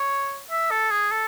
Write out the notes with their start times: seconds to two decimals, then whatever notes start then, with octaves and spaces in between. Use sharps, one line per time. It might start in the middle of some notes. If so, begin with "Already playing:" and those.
Already playing: C#5
0.51 E5
0.70 A4
0.91 G#4
1.11 A4